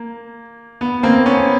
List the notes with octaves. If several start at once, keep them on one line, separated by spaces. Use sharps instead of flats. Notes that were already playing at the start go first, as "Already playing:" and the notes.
Already playing: A#3
B3
A#3 C4
B3 C#4